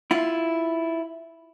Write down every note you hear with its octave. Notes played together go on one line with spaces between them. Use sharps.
E4 F4